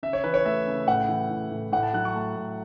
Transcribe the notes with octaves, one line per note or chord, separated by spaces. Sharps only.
C#3 E5
C#5
E3 B4
C#5
A3 E5
C#3
A2 F#5
E3
A2
A2
A2 F#5
A5
F#3 F#6
C#6
A3 A5
A2